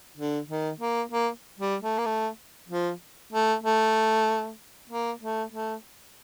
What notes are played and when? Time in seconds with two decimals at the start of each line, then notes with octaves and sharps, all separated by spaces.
0.17 D3
0.49 D#3
0.80 A#3
1.12 A#3
1.59 G3
1.82 A3
1.98 A#3
2.06 A3
2.69 F3
3.32 A3
3.63 A3
4.90 A#3
5.21 A3
5.52 A3